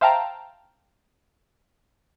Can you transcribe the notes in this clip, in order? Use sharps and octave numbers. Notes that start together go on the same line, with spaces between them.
C5 E5 F5 G5 A5 A#5